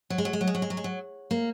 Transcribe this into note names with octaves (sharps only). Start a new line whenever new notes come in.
F#3
G#3
F#3
G#3
F#3
G#3
F#3
G#3
F#3
G#3
F#3
A#3